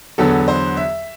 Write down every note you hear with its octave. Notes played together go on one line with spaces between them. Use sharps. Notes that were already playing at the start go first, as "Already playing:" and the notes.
E2 D3 F#3 B3 A4
C5
E5